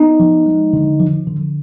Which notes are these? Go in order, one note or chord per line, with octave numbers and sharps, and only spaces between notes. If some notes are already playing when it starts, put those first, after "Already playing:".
Already playing: B3 D#4
F3
G#3
D3
F3
D3